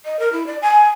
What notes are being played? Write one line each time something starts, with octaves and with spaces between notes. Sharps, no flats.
D#5
A#4
E4
D5
G#5